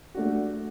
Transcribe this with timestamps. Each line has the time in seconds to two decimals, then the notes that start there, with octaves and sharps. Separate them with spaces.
0.15 A3 D4 F#4